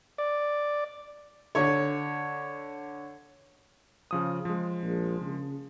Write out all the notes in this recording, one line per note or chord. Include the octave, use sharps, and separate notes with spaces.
D5
D3 C#5
C#3 F3 D#6
F3 G#3
A#1
C#3